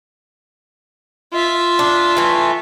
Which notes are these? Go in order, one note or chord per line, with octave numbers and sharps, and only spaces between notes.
F4 E5
D4
E3 A3